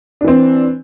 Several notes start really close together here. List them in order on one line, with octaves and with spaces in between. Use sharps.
D4 E3 C4